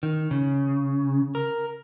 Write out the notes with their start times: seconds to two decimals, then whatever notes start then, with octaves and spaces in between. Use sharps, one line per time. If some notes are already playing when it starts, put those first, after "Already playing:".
0.03 D#3
0.31 C#3
1.35 A#4